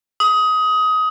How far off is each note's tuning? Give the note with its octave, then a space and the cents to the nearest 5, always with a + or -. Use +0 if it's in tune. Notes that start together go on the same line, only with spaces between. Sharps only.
D#6 +20